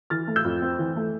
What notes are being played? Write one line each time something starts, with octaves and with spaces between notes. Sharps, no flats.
E3 F6 A6
A3
E6 G6
F2
C4
E3
A3